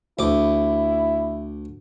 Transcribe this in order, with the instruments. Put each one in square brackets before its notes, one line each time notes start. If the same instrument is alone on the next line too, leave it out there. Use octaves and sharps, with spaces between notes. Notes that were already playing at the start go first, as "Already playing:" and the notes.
[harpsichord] D2 D6 [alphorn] E4